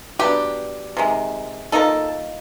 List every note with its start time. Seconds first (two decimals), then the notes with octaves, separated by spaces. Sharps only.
0.19 F#3 B3 D4 G4
0.97 C3 D#3 G#3
1.72 F3 A#3 D#4 A4